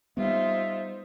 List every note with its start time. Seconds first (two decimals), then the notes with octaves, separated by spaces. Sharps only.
0.17 G3 B3 D#4 F4 C5 E5